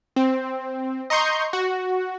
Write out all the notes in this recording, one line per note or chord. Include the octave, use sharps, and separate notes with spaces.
C4
D#5 A#5 C6 C#6 G6
F#4